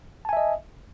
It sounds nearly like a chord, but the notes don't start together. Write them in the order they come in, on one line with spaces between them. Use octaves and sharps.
A5 G#5 E5 D#5